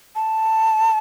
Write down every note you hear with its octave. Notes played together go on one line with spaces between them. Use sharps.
A5